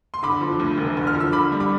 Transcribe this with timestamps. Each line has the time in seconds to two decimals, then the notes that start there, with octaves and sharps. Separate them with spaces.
0.14 C6
0.23 D3 B5 D6
0.41 F3
0.60 D2
0.78 E1
0.97 D3
1.07 F6
1.15 F3
1.20 E6
1.33 D3 B5 D6
1.52 G3
1.60 B5 D6